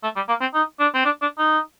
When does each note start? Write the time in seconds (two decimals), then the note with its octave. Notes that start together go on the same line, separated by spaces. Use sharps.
0.03 A3
0.16 G3
0.29 A#3
0.41 C4
0.54 D#4
0.80 D4
0.94 C4
1.05 D4
1.22 D4
1.38 D#4